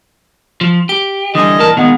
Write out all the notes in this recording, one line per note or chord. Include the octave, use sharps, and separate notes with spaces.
F3
G4 D7
D3 E3 G3 D#5 G#5
A#2 A#4 A5
A#2 D#3 G#3 B3